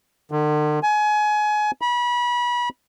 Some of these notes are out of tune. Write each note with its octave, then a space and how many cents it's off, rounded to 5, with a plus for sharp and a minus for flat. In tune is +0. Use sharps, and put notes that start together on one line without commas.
D3 +45
G#5 +25
B5 -30